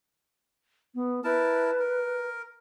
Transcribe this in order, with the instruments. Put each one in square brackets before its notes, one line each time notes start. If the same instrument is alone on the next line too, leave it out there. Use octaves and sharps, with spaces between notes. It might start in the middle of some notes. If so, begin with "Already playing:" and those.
[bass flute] B3
[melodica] E4 A#4 A5 [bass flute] B4
[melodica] A#4